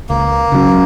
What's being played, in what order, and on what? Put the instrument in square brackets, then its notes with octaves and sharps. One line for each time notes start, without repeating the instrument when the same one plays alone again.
[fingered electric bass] C#2 [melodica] A#3
[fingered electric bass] C#3 F#3 C#4